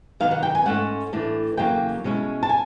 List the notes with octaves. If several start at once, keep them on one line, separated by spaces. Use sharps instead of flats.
C3 D#3 F#3 B3 D#4 F5
F#5
G5
G#5
G#2 E3 A3 C#4 F#5
A2 E3 A3 D4
E2 C#3 F#3 A#3 G5
B2 G#3 C#4 E4
A5
G#5